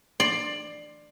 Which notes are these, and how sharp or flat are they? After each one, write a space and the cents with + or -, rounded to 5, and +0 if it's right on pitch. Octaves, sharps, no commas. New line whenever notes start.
D5 +15 C6 +15